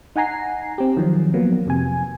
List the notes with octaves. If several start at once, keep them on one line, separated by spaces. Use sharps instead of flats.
D#4 F#5 G#5 A#5 C7
C4 G4
D#3 F3 F#3
F3 F#3 A#3 B3
F2 C3 G#5